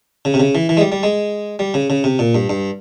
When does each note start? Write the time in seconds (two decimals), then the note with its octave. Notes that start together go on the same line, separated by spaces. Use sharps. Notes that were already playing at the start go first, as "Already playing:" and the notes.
0.25 C#3
0.34 C3
0.40 C#3
0.55 E3
0.69 E3
0.77 G#3
0.81 G3
0.92 G3
1.03 G#3
1.59 G3
1.74 C#3
1.90 C#3
2.04 C3
2.19 A#2
2.35 G2
2.49 G2